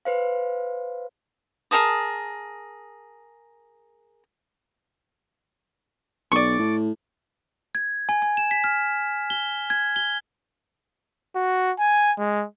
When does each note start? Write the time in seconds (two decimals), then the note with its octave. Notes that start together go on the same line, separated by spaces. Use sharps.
0.05 B4 C5 F5
1.71 G#4 A#4 A5 D#6
6.32 B1 D5 C#6
6.59 A2
7.75 G#6
8.09 G#5
8.22 G#5
8.37 E7
8.51 B6
8.64 F6
9.30 G7
9.70 G#6
9.96 G7
11.36 F#4
11.79 G#5
12.19 G#3